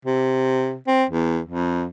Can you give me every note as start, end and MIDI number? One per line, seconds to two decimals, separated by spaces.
0.05 0.77 48
0.87 1.05 60
1.10 1.40 40
1.46 1.86 41